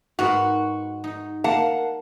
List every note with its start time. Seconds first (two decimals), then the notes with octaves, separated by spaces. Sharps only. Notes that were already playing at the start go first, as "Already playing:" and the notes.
0.19 G#2 B3 F#4 A#4
1.04 D#4
1.44 A#3 F5 F#5 A5